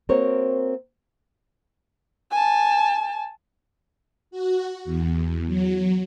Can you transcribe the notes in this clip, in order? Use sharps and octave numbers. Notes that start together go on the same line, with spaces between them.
A#3 C4 F#4 A#4 C5 C#5
G#5 A5
F#4
E2
F#3